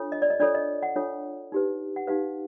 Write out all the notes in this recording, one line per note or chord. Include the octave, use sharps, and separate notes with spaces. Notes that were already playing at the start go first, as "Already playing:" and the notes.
Already playing: D4 F4 A4 C#5
D#5
D5
D#5
D4 F4 A4 C#5 D5
D#5
F#5
D4 F4 A4 C#5
D#4 G4 B4
F#5
D#4 G4 B4 F5